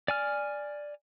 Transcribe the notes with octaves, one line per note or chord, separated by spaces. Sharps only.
D5 G#5 F6